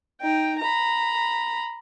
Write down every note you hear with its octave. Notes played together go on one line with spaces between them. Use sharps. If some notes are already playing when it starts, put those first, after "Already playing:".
D#4 G5
A#5 B5